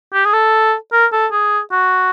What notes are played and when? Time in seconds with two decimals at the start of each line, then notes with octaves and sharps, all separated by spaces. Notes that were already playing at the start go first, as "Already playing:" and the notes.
0.13 G4
0.25 G#4
0.33 A4
0.92 A#4
1.13 A4
1.32 G#4
1.71 F#4